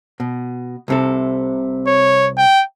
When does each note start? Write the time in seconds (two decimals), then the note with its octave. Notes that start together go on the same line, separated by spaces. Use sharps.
0.20 B2
0.88 C2 C3 A4
1.87 C#5
2.37 G5